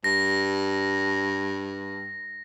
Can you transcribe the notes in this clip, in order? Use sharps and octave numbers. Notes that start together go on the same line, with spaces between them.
G2 A#6